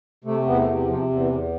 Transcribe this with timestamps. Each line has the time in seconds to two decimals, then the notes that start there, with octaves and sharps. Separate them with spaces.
0.24 C3 A3
0.46 E2 B3
0.57 A3
0.68 C3
0.88 C3 F3
1.09 E2
1.19 E3
1.31 E2